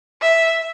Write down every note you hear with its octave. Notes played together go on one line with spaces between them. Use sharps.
E5